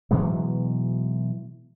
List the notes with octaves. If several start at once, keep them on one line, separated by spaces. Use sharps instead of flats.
B2 E3 F#3 G#3